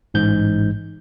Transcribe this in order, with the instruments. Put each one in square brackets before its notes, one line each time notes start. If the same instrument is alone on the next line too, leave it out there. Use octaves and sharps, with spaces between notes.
[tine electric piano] A1 G#2 G6